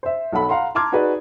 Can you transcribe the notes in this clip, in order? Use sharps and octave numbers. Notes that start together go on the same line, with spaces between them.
C5 E5
B1 A4 F#5 B5
F5 F#5 A#5 C6
A5 A#5 C6 D6 F6 G#6
D#4 F#4 G#4 B4 D5